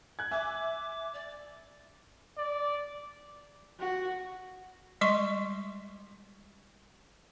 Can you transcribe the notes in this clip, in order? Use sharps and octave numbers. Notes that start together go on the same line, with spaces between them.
F#6 G#6
E5 G#5 D6
D5
D5
F#4
G3 G#3 D#5 C6 C#6